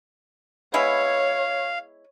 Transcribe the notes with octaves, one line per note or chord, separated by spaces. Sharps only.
G#3 B3 E4 C#5 F5